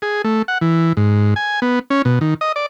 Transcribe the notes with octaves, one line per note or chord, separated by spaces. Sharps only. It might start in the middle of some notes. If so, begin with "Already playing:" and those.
G#4
A3
F#5
E3
G#2
G#5
B3
C#4
B2
D#3
D#5
D5